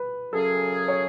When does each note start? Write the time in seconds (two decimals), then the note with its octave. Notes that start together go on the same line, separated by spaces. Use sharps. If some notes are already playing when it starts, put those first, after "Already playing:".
Already playing: B4
0.33 F#2 C#3 F#3 C#4 G#4 A4
0.88 C#5